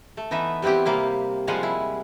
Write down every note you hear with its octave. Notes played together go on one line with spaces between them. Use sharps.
A3
E3 B3 D#4 E5
G3 B3 C4 E4 G4
C3 A#3 E4 F5
F3 G3 G#3 F5 F#5 G#5
E4